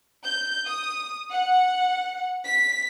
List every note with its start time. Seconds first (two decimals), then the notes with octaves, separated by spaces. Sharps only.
0.24 G6
0.67 D#6
1.29 F#5
2.45 B6